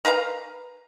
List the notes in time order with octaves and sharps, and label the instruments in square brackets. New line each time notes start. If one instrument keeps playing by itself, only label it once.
[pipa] A#4 B4 F5 A#5